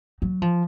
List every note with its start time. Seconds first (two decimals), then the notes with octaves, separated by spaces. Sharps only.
0.22 F#3
0.42 F3